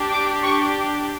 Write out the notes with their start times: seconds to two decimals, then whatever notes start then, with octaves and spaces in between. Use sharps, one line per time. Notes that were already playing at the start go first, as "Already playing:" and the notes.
Already playing: D4 G4
0.11 D6
0.43 C#6